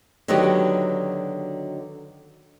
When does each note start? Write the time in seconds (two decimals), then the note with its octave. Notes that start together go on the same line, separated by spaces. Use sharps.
0.28 D3 D#3 F#3 B3 F#4 G4